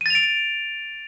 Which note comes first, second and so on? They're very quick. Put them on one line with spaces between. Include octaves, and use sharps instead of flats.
D#7 A6 F7 D7